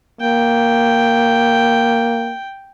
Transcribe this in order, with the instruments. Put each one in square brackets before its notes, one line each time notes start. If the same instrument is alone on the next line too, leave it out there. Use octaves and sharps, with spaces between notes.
[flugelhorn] A#3 [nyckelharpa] G5